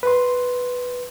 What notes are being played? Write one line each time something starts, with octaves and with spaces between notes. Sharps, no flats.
B4 C6